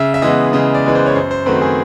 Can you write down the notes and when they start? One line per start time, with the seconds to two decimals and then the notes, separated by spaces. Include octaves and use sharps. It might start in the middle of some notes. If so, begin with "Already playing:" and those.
Already playing: C#3 E5
0.14 E5
0.22 E3 G#3 B3 D#5
0.53 C#3 D#5
0.74 D5
0.84 E3 G#3 B3 B4
0.95 C5
1.06 C#5
1.15 F#2 C5
1.31 C5
1.46 D#3 F#3 A3 C4 B4
1.62 G#4